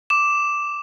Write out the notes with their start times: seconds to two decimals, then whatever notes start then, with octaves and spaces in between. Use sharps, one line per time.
0.10 D6 E7